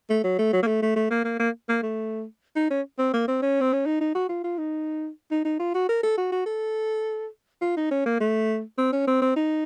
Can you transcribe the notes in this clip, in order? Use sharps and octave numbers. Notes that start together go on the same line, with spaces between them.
A3
F#3
A3
F#3
A#3
A3
A3
A3
A#3
A#3
A#3
A#3
A3
D#4
C#4
C4
A#3
C4
C#4
C4
C#4
D#4
D#4
F#4
F4
F4
D#4
D#4
D#4
F4
F#4
A#4
A4
F#4
F#4
A4
F4
D#4
C#4
A#3
A3
C4
C#4
C4
C4
D#4